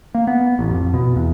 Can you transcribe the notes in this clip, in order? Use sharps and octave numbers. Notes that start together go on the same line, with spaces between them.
A#3
B3
A1
F2
B2
E2